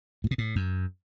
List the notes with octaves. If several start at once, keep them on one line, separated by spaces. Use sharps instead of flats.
A2
B2
A2
F#2